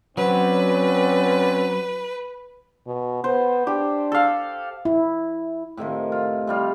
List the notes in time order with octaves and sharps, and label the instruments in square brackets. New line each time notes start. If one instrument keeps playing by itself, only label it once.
[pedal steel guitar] F#3 [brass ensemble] C4 C#4 D5 [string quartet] B4
[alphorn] B2
[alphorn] B3 [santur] C5
[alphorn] D4 [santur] G4
[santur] A4 F5
[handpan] E4
[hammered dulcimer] A2 C3 D#3 F3
F4
C3 G3 F4